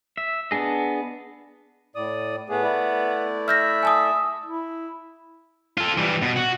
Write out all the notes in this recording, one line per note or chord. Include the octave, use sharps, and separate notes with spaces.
E5
B3 D4 G#4 D#5
A2 D5 D#6
A2 A3 B3 G#4
A3 E4 D5
E5 F6 G6 A#6
G#5 A5 D#6
E4
F4 A4
E3 G3
B2
F#4